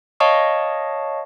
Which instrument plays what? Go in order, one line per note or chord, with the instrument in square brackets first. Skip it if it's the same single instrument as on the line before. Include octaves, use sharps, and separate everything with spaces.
[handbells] C#5 D#5 F5 A5 C#6 D#6